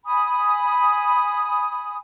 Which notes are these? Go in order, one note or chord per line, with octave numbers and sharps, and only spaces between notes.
G#5 B5 D#6